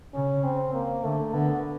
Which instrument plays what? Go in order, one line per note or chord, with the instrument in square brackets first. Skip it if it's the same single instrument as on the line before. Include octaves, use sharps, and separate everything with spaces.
[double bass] C#3 [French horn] C#4
[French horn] C4
A#3
[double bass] D3 [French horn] A3
[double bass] D3 [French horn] B3